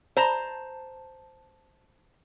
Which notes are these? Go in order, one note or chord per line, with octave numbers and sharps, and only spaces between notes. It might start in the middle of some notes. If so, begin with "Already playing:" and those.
C5 A5 A#5